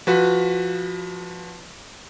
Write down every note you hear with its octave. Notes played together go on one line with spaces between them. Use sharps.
F3 F#4 B4